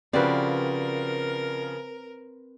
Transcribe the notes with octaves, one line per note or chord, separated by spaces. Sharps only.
C#3 F3 C4 F#4 G4 A#4 B4 D5